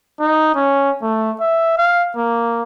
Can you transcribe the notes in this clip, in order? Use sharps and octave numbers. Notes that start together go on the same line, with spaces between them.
D#4
C#4
A3
E5
F5
A#3